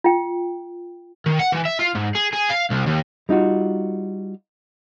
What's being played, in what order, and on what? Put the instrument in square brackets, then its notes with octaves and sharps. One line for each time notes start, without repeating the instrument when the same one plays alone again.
[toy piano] F4 G5
[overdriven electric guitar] D#3
F#5
E3
E5
F4
G#2
G#4
G#4
F5
C2
D#2
[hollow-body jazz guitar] G3 D#4 F4 F#4